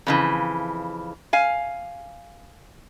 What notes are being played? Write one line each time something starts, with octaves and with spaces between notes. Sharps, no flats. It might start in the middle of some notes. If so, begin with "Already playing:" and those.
F2 C#3 E3
F5 G#5